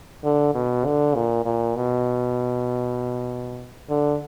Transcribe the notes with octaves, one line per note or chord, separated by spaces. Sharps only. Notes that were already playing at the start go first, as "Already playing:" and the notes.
D3
B2
D3
A#2
A#2
B2
D3